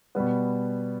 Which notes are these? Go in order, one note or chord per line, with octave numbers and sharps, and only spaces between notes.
B2 G3 B3